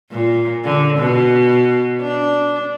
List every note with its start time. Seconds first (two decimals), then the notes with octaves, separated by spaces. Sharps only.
0.12 A#2
0.65 D3
0.98 B2
2.01 D4